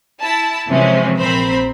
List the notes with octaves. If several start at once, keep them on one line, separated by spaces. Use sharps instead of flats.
E4 A5
C3 E3 F3 G#3 C4 C#4
A#1 C4 A#4 C5 B5